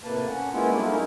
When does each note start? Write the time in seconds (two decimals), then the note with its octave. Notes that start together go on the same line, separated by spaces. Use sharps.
0.04 A2 C3 A#3 B4 A5
0.27 C#4 F#5
0.54 G#3 A#3 B3 C#4 E4 F4
0.72 F#3 G3 A3 A#3 D4 E4
0.87 C#4 D#4 E4 A#4